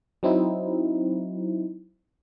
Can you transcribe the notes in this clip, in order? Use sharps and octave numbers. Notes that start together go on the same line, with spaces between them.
F#3 C4 D#4 E4